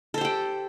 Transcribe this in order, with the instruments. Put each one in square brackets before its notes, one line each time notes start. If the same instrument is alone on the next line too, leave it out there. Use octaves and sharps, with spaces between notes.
[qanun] A4
C5
G4
G5